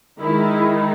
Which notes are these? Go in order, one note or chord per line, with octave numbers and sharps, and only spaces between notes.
D#3 G#3 D#4 E4